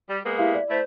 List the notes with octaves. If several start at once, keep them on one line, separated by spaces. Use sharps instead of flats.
G3
G#3 A#3 B3
E4 G4 E5 F5
D5
A3 E4 C5